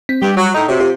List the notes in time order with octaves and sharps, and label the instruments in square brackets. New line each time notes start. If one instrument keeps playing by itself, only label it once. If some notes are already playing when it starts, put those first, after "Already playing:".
[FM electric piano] C4 B6
[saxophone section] G2 G4 [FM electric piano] G3
[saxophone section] F#3
[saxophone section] A2 D#4 [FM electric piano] A#5
[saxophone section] C3 [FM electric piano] F#4 C#5
[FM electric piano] F4 G4 C5